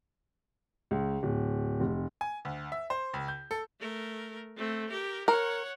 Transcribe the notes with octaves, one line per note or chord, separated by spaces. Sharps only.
C#2
D1
F1
G#5
D2
E5
C5
C#2
G6
A4
A3 A#4
A3 C4
G4 A#4
A#4 C#5 F#5